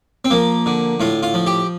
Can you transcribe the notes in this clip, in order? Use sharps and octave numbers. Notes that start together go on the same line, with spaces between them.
C4
F3 A#3
D3
A2 F4
F4
F3
G4